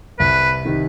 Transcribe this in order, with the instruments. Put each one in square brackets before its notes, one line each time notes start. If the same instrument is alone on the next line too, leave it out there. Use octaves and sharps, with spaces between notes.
[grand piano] C2 [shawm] B4
[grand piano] C3 D#3